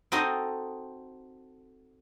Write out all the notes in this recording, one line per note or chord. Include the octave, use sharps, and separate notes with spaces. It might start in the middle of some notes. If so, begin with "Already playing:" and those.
C4 D#4 F#4 A4 C5 D#5